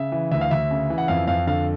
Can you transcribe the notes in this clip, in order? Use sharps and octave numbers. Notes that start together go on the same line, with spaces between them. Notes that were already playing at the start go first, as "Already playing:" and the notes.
Already playing: C#3 E5
E3
D2 E5
F5
D2 E5
C#3
E3
F#5
F2 F5
F2 F5
D3 F5